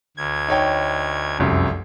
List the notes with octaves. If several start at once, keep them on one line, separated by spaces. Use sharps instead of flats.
D2 G#6
D#4 C#5 G5
F1 C2 F#2